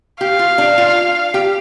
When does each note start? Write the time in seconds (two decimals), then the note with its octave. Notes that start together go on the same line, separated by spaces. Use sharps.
0.21 G4 F5
0.39 F4
0.58 D4
0.78 F4
1.34 G4